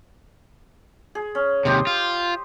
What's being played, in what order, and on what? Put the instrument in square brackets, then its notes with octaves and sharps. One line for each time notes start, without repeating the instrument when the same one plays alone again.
[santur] G#4
C#4
[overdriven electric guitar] D#2 C3 [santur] G4 C5 D#5
[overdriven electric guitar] F4